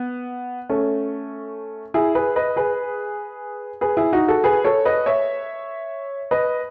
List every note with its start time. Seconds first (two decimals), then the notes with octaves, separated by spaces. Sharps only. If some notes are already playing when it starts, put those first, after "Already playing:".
Already playing: B3
0.69 A3 C#4
1.94 E4 G#4
2.15 G#4 B4
2.36 B4 D#5
2.56 G#4 B4
3.81 G#4 B4
3.97 E4 G#4
4.13 D#4 F#4
4.28 F#4 A4
4.44 G#4 B4
4.65 A4 C#5
4.85 B4 D#5
5.06 C#5 E5
6.31 B4 D#5